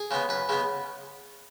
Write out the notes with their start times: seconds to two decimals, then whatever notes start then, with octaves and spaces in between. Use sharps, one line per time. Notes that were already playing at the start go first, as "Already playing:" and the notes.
Already playing: G#4
0.11 C#3 G#3 B3
0.29 F#2 B4
0.49 C#3 G#3 B3